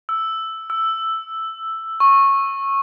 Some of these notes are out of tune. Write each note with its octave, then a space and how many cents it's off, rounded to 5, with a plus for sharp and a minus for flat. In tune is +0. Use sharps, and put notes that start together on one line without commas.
E6 +0
E6 +5
C#6 -15